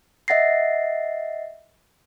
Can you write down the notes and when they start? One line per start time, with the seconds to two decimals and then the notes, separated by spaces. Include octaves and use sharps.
0.28 D#5 E5 F#5 A6 A#6 C7